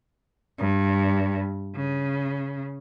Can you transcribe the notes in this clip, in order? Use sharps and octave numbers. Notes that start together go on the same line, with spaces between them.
G2
C#3